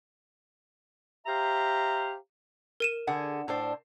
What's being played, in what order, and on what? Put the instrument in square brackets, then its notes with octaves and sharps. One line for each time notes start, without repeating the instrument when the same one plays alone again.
[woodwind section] G4 C5 E5 F5 A#5
[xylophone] A#4 D#7 E7
[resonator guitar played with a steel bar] D3 G#4 F#5
A2 D4 C5